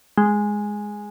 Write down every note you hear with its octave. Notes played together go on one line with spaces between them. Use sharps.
G#3